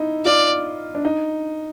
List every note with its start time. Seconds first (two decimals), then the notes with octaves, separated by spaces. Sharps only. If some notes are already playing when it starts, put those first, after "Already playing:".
Already playing: D#4 E4
0.25 F4 D5
0.95 D4
1.05 D#4